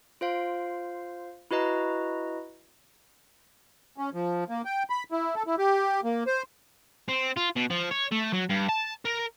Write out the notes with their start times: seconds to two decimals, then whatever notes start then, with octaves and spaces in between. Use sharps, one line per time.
0.21 F4 C5 F5
1.51 E4 F#4 B4 D#5 A#5
3.98 C#4
4.14 F3
4.49 A#3
4.65 G5
4.90 B5
5.12 E4
5.35 A4
5.47 E4
5.58 G4
6.04 A#3
6.27 C5
7.08 C4
7.37 F4
7.56 B2
7.70 F3
7.91 C#5
8.11 A3
8.33 F#3
8.49 G2
8.69 A5
9.05 A#4